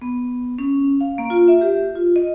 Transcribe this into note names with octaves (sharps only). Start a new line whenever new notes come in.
B3
C#4
F5
A#3
F4
E5
G4
F4
D#5